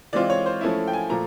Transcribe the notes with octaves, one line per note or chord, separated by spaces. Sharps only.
E3 G#3 C4 F4 D5
C#5
C5
F3 A3 C#4 E4
G5
G#5
A#2 F3 A3 A#5